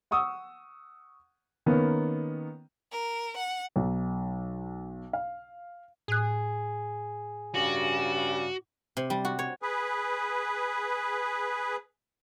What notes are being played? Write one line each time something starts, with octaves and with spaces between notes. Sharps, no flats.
F#5 C#6 D#6 E6
D#3 A#3 B3 C#4
A#4
F#5
B1
F5
A2 G#4 F#6
G2 C#3 F#4 D5
C3
G3
F#4
C#5
G#4 B4